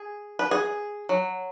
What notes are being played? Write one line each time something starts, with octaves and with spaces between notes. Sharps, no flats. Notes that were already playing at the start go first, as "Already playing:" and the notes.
Already playing: G#4
B4
G#4
F#3